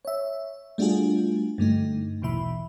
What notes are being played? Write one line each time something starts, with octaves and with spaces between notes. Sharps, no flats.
C#5 E5
G3 A3 D4 F4 F#4 G#4
G2 D3 A3 D#4
A#1 E2 B2 E3 E5 B5